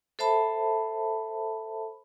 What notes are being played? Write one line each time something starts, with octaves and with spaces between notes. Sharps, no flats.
A4 C5 E5 A5 B5